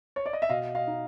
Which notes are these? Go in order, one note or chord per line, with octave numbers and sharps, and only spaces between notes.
C#5
D5
D#5
E5
B2 D#5 F5
D#5 F5
D#4